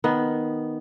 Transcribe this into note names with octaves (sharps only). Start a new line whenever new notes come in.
D#3 B3